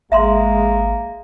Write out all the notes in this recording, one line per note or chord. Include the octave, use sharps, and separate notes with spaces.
G#1 G#3 A#3 E5 A#5 C6